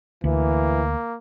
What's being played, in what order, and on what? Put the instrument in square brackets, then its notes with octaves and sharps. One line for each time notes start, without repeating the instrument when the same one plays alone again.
[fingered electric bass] D2 [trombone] E3 [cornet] A#3